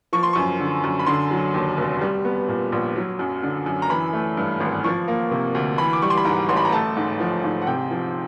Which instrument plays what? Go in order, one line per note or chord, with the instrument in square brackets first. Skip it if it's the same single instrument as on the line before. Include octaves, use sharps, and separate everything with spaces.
[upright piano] F3 C#6
C6
F#2 C#6
D3
F#2
B5
D3 C6
F#3
D#2
F1
G3
B3
A#2
A#1
F#3
F#2
D3
F#2
A#5
E3 B5
A3
G2
G#1
F3 C#6
A#3
C3
D2
E3 B5
D6
G3 C#6
C6
B5
G#2 A#5
A1 C6
B5
A#5
A3 A5
G#2
F3
G#2
F#5
C3 G5
F3